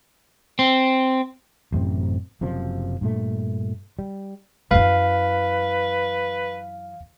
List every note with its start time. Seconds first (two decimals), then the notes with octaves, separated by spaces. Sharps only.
0.59 C4
1.72 A1 F#2 C3 C4
2.41 F#1 F#2 C3 F3
3.01 G2 A#2 A3
3.99 G3
4.71 F#2 E3 B4 F5